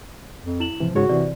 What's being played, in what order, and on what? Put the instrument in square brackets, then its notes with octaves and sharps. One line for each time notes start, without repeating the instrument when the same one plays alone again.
[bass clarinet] F2
[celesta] E4 E7 F#7
[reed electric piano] G#2 C3 E3 [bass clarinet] F3
[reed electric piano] G#2 C#3 C#5 [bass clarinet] F#4 [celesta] G#4
[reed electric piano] C3 E3 [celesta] D5